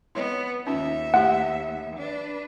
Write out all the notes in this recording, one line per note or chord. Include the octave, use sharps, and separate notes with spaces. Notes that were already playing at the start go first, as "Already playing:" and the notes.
B3 E4 C#5 D#5
D#2 C#4 D#4 F4 E5
A3 E4 G4 F#5
D4 B4